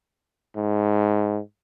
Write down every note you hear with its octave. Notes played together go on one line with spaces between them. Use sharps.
G#2